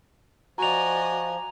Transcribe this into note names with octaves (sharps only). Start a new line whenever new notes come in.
F3 F#4 D5 D#5 G#5 A#5 F7